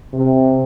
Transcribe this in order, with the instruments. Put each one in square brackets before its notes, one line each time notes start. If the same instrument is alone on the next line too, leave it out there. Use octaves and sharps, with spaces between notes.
[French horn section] C3